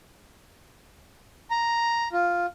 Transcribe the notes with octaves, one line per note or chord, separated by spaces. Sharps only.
A#5
F4